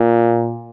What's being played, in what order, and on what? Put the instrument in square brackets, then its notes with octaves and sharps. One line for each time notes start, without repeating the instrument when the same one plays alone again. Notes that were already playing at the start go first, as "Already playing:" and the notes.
Already playing: [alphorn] A#2